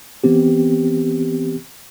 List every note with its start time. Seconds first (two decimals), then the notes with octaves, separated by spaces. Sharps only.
0.24 E3 B3 C4 G4